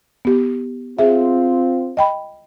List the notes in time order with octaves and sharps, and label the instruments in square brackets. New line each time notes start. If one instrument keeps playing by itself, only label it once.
[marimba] B3 G4
[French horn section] C4 F4 [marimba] G#4 E5
[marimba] D#5 G5 B5